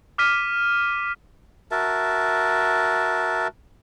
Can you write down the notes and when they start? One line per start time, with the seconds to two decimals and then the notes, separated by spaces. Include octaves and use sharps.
0.18 D6 F6 B6 D#7
1.71 F#4 A#4 E5 A5